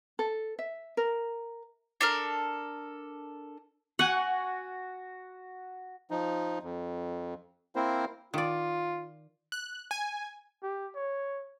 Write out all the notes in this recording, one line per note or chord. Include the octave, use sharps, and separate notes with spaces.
A4
E5
A#4
D4 A4 A#4
F#4 F#5 G#5
F3 D#4
F2
A#3 C4 E4 A#4 C5
D#3 F4 D5
F#6
G#5
G4
C#5